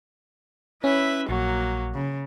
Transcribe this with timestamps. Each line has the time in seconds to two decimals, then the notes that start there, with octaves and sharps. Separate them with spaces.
0.84 C#4 E4 B4 E5
1.29 A#1 F#3 A#3 F#4
1.94 C#3